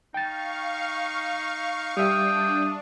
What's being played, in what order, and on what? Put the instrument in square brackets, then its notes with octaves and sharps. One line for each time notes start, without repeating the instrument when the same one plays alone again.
[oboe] D#4 [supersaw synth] F5 C#6 [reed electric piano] G5 A6
[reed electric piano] G3 E5 [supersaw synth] D4 [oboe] G5 [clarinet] D#6